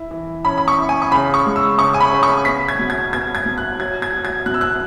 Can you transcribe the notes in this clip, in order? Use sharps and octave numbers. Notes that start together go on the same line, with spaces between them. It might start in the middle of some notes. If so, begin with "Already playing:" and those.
Already playing: E4
E3
C#4 B5
B5
C#6
E4
G#5
C#6
C#3 B5
C#6
G#3
E6
C#3 C#6
G#5
B5
C#3
C#6
B3 B6
G#6
B2
G#6
B3 G#6
G#6
B2
F#6
F#3 G#6
G#6
F#3
G#6
B2 F#6
E6
F#6